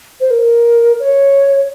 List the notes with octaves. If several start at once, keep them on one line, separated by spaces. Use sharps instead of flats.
C5
A#4
C#5